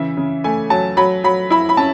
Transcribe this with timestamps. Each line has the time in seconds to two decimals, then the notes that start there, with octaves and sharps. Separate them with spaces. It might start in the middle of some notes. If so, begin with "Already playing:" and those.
Already playing: C#3 E3 E5
0.17 C#3
0.44 A3 G#5
0.70 F#3 A5
0.97 F#3 B5
1.24 F#3 B5
1.50 E4 B5
1.69 B5
1.77 C#4 A5